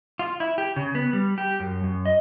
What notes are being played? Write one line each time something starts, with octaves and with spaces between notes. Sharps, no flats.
F4
E4
G4
C#3
B3
G3
G4
F#2
F#2
D#5